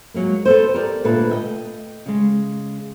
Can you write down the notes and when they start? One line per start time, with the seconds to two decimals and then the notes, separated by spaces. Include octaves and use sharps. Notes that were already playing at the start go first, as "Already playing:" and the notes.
0.14 F#3 G#3 A#3
0.45 B3 A4 C5
0.73 G4 A#4 B4 D5
1.04 A#2 D3 A3 B4 A5
1.29 D#5 E5 G5
2.06 C#3 G#3